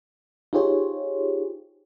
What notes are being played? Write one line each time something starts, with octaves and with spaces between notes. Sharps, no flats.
D#4 F4 G4 G#4 C5 C#5